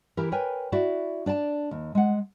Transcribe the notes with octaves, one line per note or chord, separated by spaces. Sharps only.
E3 E4 G4 A#4
A#4 B4 C#5 G5 G#5
E4 F#4 D5
D4 D5 G5 A5
D#2
G#3 F#5